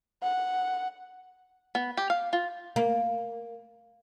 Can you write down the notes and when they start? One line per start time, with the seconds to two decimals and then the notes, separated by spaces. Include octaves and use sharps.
0.23 F#5
1.75 B3
1.97 G4
2.10 F5
2.33 F4
2.76 A#3